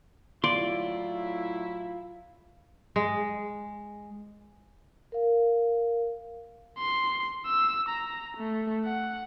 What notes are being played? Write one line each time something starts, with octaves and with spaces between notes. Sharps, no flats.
A2 F#3 E4 F4 D5 C6
G#3
A#4 F5
C6
E6
A#5
A3
F#5